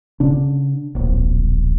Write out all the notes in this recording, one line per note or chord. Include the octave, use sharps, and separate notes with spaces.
C#3 D4
D1 A#1